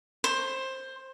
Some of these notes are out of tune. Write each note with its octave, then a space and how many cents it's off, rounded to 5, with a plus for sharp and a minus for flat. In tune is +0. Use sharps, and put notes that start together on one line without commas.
C5 +15